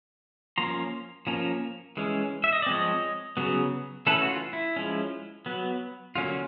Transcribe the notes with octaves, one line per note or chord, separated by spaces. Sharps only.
F3 A#3 C#4 A#5 C6
F3 A#3 C#4 G#5 A#5
E3 G#3 C#4
E5
D#5
D5
F3 G#3 C4 C#5 D#5
C#3 F#3 B3
E3 A3 C#4 A4 B4
F#4
F4
E4
F3 G#3 C#4
F#3 B3
D3 F#3 A#3 C#4 F4